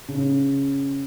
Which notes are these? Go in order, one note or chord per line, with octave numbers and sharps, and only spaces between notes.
C#3